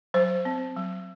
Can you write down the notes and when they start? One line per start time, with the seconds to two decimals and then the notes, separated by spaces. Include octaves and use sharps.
0.14 F#3 C5
0.45 C4
0.76 F#3